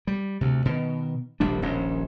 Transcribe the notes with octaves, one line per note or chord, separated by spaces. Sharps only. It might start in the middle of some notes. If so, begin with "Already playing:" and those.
G3
D2 C3
B2 D#3
D#1 A#1 G3 D4
D#1 A#1 C#4